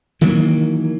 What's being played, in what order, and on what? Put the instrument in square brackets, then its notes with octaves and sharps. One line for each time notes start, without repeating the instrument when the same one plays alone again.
[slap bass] D#3 E3 F#3 A#3